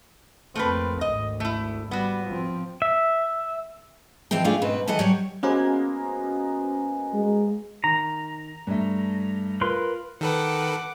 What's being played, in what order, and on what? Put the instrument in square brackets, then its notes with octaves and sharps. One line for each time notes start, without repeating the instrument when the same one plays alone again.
[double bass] F2 C4 [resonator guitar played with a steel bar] A3 A#3 B4
[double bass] G#1 D2 [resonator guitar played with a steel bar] D#5
[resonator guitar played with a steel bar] A3 E4
[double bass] G3 [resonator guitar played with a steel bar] B3 F#4
[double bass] F3 C4
[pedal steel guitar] E5
[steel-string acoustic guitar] E3 F3 G#3 C4 G5
A3 D4 E4 F4 G#4
G#2 B2 C4 B4
D#2 E3 A4 D#5 F#5
F#3 G3 C#5
[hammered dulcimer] G#3 A#3 B3 [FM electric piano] C#4 F#4 C5
[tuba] G#3
[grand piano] D#3 [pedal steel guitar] A#5
[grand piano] G2 A3
[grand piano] F4 [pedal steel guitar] A#4 B4 C6
[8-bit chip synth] D#3 A4 B4 [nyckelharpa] F#5 D6